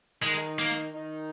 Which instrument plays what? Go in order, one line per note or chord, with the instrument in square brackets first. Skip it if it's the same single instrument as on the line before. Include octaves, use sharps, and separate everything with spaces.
[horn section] D#3 D#4 [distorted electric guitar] G#3
[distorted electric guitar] A#3
[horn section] D#3 D#4